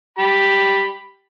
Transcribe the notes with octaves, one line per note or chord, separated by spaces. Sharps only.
G4 B5